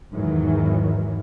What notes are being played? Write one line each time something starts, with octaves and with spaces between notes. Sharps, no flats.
E2 G#2 D#3 E3 F#3